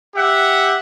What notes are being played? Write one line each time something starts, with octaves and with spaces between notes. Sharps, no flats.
G4 E5 F#5